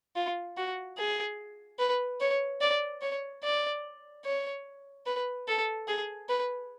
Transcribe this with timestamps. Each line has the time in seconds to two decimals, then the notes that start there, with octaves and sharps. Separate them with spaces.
0.16 F4
0.57 F#4
0.97 G#4
1.79 B4
2.20 C#5
2.61 D5
3.01 C#5
3.43 D5
4.24 C#5
5.06 B4
5.48 A4
5.87 G#4
6.29 B4